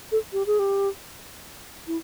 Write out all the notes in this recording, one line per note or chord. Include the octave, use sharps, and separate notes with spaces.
A4
G4
G#4
G4
E4